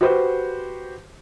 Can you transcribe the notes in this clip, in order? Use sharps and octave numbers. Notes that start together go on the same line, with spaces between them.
F#4 G4 B4 C5